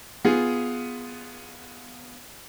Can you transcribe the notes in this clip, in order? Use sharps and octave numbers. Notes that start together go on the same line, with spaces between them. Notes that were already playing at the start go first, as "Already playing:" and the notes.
B3 F4 G#4